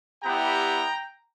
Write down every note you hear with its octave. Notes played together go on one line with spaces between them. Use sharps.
G3 B3 E4 G4 G5 A#5